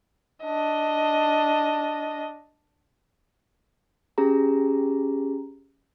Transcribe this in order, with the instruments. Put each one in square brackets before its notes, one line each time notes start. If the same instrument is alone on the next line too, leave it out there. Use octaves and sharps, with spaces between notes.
[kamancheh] D4 D#5
[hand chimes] C#4 G4 G#4 A#5